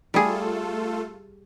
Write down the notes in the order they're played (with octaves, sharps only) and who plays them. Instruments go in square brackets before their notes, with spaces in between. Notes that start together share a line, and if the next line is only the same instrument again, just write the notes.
[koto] G3 G#4 [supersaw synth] A3 F4 A4